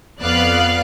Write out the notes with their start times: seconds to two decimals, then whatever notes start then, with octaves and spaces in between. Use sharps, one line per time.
0.20 F2 B3 B4 D5 F5 F#6